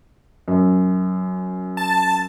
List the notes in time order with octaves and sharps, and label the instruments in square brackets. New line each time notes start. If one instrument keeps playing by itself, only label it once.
[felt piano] F#2
[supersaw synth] A5